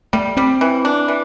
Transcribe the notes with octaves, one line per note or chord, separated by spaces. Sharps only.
G3 A3
G3 C4
E3
D4
E3